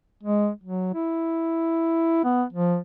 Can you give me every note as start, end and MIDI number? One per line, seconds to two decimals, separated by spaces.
0.23 0.49 56
0.64 0.94 54
0.94 2.24 64
2.24 2.44 59
2.53 2.77 53